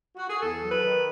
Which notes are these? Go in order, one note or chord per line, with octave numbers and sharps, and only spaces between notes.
F#4
G#4
E2 A4
F#3
B4
D#3